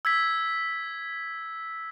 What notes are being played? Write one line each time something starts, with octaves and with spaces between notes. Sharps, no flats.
E6 G#6 B6